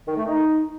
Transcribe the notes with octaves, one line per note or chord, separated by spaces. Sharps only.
D#3
A3
D#4